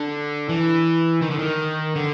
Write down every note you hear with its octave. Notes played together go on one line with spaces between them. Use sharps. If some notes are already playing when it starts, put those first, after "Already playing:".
Already playing: D3
E3
D#3
D3
D#3
D3